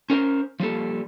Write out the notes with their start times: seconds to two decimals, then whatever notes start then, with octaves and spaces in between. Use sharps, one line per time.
0.10 C#4 A#4 C5
0.60 F3 G3 A#3 A4